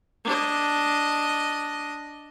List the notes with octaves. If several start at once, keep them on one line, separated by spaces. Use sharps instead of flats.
D4 D#5